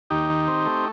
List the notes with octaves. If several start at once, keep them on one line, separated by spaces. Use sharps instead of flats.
D#2 D#4 G4
D#3
C4
A3